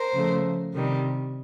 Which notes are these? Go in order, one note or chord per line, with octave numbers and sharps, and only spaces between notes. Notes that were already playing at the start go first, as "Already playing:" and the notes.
Already playing: A#4 C5
C#3 F3 A3
C3 D#3 G3